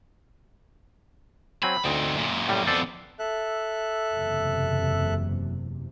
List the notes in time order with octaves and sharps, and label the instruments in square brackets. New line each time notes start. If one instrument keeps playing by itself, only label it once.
[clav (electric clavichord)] F#3 C4 G#5 [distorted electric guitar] B5
[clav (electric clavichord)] D2 [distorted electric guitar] C4 D#4
[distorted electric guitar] F#2 A#2
[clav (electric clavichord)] A2 G3
[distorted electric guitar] F2 B3 [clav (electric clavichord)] A4 C5 D5
[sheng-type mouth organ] A4 E5 F#6
[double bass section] F#1 E2 C3